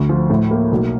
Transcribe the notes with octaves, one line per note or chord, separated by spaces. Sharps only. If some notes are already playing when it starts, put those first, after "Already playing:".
Already playing: D2
F3
A2
A#3
B1